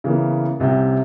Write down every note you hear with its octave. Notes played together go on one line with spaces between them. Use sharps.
C#3 E3 A#3 B3
C2 C3 C#4 G5